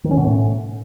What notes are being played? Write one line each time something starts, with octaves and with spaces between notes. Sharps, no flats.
D#3
C#4
B2
A2